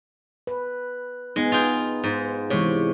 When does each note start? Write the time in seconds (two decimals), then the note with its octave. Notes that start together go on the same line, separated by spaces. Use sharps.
0.47 B4
1.36 G#3 B3 D#4
1.52 F4 G#4 G5
2.04 G#2
2.50 C3 E3 G#3 C#5